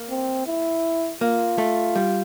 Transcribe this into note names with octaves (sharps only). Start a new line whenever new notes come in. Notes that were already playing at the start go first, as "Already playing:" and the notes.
Already playing: A#3
C4
E4
A#3 F4
A3
G3